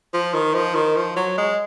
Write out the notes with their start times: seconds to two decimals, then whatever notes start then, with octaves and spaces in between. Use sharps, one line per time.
0.14 F3
0.34 D#3
0.54 F3
0.75 D#3
0.97 F3
1.16 F#3
1.38 G#3